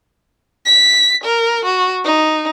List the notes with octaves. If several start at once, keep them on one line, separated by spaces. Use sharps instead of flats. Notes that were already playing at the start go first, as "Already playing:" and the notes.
B6
A#4
F#4
D#4